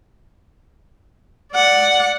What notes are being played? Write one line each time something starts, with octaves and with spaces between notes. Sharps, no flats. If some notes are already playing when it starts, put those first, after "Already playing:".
D5 F#5